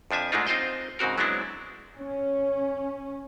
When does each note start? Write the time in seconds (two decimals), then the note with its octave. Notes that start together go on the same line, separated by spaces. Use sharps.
0.11 F2 F3 D4 E5 G#5
0.32 G#2 G#3 A3 D4 D#4 F4
0.47 C4 D#4 F4 C5 D#5 G5
0.99 G#2 C#3 C4 F#4 A#4
1.18 F#3 G#3 B3 C4 D4 E4
1.99 C#4